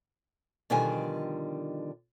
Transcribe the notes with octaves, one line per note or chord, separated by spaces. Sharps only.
B2 D3 D#3 F3 G3 G#5